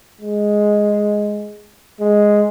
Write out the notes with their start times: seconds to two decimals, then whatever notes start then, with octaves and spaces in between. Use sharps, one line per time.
0.21 G#3
2.00 G#3